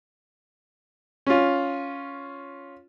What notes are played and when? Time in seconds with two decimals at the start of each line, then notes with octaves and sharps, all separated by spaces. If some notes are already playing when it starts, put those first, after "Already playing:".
1.27 C#4 F4